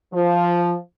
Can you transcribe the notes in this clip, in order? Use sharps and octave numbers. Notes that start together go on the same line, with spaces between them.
F3